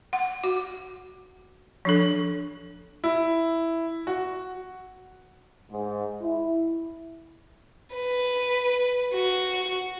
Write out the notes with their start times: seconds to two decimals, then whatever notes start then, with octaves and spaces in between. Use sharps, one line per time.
0.13 F#5
0.44 F#4
1.85 F3 D4 A4
3.04 E4
4.07 F#4
5.71 G#2
6.21 E4
7.95 B4
9.14 F#4